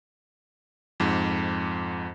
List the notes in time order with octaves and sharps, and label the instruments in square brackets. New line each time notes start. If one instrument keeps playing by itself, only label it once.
[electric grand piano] F2 G#2